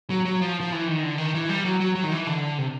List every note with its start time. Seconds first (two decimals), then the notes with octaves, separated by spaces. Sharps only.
0.10 F#3
0.25 F#3
0.41 F3
0.61 F3
0.72 E3
0.87 D#3
1.03 D3
1.18 D#3
1.34 E3
1.49 G3
1.65 F#3
1.80 F#3
1.96 F#3
2.04 D#3
2.12 E3
2.27 D3
2.58 C3